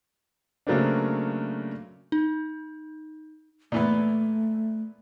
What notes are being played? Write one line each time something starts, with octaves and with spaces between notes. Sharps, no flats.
C#3 F#3 A3 A#3 C4 D4
D#4
A#2 E3 A3 B3